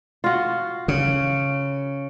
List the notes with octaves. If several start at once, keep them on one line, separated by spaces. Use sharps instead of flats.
F4 F#4
C#3